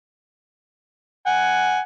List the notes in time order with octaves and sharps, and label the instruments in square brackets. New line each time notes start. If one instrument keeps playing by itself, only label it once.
[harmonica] F#5 G#5